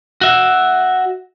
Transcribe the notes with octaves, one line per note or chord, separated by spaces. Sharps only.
F#4 E5